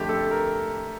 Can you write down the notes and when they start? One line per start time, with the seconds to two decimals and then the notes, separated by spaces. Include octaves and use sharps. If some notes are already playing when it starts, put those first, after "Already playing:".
Already playing: F2 D3 A3 G4
0.09 A4
0.31 A#4